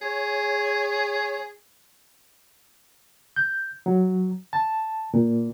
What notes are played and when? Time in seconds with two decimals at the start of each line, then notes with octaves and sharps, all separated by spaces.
0.01 G#4 C#5
3.36 G6
3.86 F#3
4.53 A5
5.14 A#2